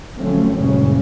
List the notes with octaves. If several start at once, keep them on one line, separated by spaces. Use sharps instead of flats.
D3 F3 F#3 A3 C4 C#4
F#1 G2 A#2 C#3 G#3 C#4